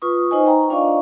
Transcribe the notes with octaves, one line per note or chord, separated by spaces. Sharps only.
F4 B4 C#6 D#6
D#4 C5 D#5 G#5
G5 A#5
D4 F4 D5 D#5 F5 C#6